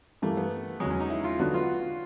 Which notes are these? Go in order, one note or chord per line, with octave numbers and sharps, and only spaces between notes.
G2 E3 G3 A3 A#3
B3
E2 C#3 F#3 G#3
C#4
D#4
E4
F4
D3 F#3 B3 D4 F#4
F4